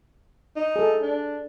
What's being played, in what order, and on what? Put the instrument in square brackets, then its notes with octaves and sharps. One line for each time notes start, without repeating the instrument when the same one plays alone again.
[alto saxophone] D#4
[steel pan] G#4 A4
[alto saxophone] D4